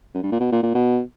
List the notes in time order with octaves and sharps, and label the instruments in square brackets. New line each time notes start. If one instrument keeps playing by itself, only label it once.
[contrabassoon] F#2
G2
A#2
B2
A#2
A#2
B2